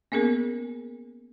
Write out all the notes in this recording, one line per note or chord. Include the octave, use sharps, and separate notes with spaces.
A#3 B3 C#4 G#4 A#4